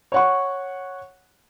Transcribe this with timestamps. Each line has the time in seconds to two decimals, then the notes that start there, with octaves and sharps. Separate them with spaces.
0.12 C#5 F#5 C#6